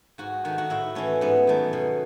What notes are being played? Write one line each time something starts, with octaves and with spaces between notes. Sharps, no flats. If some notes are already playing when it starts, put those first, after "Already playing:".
G#2 F#4
D#3 A3 F#4
F#4
A2 E4
E3 A3 C#4
G#2 B3
D#3 F#3 A3
B2